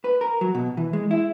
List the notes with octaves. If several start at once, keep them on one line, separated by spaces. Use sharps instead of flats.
B4
A#4
F#3
B2
E3
G#3
E4